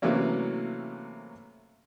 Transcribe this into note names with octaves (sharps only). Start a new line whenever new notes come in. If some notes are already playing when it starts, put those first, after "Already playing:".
C3 E3 F#3 A3 A#3 C#4